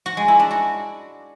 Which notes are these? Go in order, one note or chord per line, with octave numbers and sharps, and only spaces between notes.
F#4
G#3
E4
D4
F#4